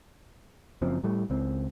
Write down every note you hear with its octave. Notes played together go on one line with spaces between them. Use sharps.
F#1 F#2 F3 C4
A2 G3 A3
C#2 C4